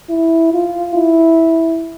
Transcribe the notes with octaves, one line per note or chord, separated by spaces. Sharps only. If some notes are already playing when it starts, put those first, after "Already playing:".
E4
F4
E4